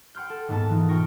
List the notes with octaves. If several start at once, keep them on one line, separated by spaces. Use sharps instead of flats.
F#5 G5 C6 F6 G6
A4
D#1 G#2 A#3 B3 A5
E3 B3 D#4 F4
B2 F4 A#4 G5 C#6 A#6